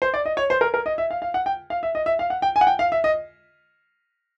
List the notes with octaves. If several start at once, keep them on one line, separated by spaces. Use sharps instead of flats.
C5
D5
D#5
C#5
C5
A#4
A#4
D#5
E5
F5
F5
F#5
G5
F5
E5
D#5
E5
F5
F#5
G5
G#5
F#5
G5
F5
E5
D#5